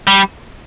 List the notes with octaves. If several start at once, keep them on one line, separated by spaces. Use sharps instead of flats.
G3